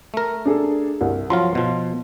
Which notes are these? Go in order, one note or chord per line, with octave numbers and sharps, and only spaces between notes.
A3 A#4
D4 G#4 A4
C2
F3 F#3 F4 C6
B2 F3